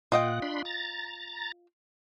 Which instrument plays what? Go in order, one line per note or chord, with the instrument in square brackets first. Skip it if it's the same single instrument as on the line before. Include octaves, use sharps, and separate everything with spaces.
[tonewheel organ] A#2 F#5 [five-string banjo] F4 D#5 G5
[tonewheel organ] D4 B5 C6
A#5 A6